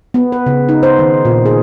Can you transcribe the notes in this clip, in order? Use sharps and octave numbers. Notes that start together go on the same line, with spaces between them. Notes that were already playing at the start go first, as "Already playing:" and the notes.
B3
B4
C#3
D#4
C5
D#3
A#2
G#4